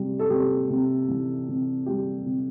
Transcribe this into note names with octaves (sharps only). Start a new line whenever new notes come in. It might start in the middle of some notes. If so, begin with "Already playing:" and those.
Already playing: C3 G3
A4
C3 G4
C3
E3
C3
G3 G4
C3